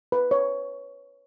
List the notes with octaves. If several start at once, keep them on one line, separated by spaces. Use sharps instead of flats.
B4
C#5